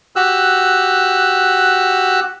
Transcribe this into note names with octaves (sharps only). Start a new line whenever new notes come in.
F#4 G4 E6 F#6